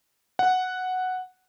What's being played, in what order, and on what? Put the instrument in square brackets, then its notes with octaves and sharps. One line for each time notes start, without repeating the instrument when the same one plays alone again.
[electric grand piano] F#5